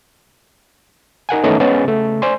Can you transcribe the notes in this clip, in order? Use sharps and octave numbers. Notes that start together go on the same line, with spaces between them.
D#4 A#4 F#5 G#5
D#3 E3 A3 B3 C#4 D#4
G#3 B3 C#4 G#4 D#5 A6
C#3 A3
C5 D5 G#5 C6